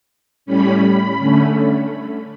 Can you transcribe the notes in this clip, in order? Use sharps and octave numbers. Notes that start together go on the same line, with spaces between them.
A2 G3 C#4 B5
B5
D3 A3 C#4